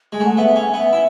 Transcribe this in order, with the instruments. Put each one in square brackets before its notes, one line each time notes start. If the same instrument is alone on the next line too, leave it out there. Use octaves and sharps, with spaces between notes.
[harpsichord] G#3 [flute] G#5
[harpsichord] A3
[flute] F#5
[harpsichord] B3 [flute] E5
[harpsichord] C#4 [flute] G#5
[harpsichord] B3 [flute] E5
[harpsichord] E4